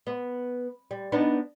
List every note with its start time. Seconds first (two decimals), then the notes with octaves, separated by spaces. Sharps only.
0.07 B3
0.91 G3
1.12 B3 D4 D#4